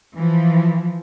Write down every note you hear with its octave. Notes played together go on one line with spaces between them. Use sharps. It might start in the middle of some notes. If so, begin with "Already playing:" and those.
E3 F3